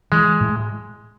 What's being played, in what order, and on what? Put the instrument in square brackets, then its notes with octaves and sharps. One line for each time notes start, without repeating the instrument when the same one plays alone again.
[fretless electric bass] E3 [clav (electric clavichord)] G#3
[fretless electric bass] A2